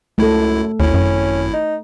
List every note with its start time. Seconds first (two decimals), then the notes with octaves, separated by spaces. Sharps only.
0.18 C#2 F#2 A3 E4 A4
0.80 G#1 D#2 C#4 E4
0.94 F#2
1.53 D#4